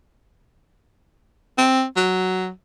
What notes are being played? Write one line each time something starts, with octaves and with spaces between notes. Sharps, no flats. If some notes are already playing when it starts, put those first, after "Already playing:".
C4
F#3